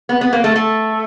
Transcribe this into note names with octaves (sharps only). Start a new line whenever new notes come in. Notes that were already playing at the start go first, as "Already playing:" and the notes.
B3
B3
A#3
A3
A3